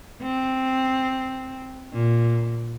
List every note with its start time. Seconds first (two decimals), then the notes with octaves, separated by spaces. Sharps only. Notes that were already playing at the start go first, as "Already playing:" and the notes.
0.22 C4
1.92 A#2